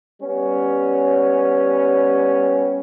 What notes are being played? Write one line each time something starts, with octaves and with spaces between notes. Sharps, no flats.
G3 B3 C#4